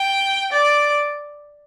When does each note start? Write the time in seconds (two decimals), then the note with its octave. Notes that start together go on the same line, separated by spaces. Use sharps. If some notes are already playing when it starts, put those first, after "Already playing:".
Already playing: G5
0.52 D5